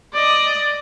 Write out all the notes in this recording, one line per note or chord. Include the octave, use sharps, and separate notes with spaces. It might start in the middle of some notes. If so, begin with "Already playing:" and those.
D5 D#5